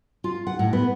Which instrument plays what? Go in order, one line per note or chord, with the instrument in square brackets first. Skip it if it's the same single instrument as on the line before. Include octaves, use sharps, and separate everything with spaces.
[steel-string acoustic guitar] F4
F#5
A2
B3